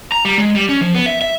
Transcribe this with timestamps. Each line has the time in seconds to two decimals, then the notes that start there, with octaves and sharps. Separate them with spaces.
0.12 A#5
0.25 G3
0.38 G#3
0.55 G3
0.69 C#4
0.81 F3
0.95 B3
1.06 E5
1.22 E5